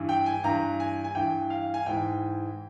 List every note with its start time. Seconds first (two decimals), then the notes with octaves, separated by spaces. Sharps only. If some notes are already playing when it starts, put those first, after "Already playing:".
Already playing: G2 E3
0.09 G5
0.26 G#5
0.44 G2 E3 A#5
0.80 G#5
1.04 G#5
1.15 G2 E3 G5
1.50 F5
1.74 G#5
1.86 G#2 E3 G5